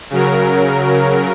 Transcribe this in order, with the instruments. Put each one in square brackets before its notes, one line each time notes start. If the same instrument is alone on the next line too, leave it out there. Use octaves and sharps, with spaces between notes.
[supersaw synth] C#3 F#3 A#4